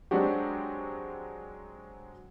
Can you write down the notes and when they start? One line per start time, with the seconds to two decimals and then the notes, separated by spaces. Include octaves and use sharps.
0.11 F#3 G#3 C4 D4 F#4 G4